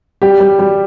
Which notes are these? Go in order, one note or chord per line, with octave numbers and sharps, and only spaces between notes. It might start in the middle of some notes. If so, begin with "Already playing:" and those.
G3 G4
G3
G3